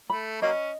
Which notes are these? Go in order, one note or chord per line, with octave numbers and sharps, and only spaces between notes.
A3 B5
F#3 A#3 C#4 D#5